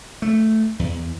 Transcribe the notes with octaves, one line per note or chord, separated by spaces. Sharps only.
A3
E2